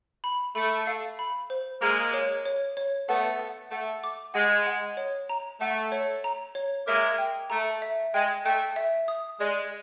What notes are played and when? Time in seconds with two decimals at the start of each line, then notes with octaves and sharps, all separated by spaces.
0.24 B5
0.55 A3 B5
0.87 F5
1.19 B5
1.50 C5
1.81 G#3 A#3 A#5
2.14 C#5
2.45 C#5
2.77 C#5
3.08 A3 B3 F#5
3.39 F#5
3.71 A3 F#5
4.04 D6
4.34 G#3 F#5
4.66 F#5
4.97 C#5
5.29 A#5
5.60 A3 F#5
5.92 C#5
6.24 A#5
6.55 C#5
6.87 G#3 A#3 E5
7.18 G5
7.50 A3 A#5
7.82 E5
8.14 G#3 G5
8.45 A3 G5
8.76 E5
9.08 D#6
9.40 G#3 D5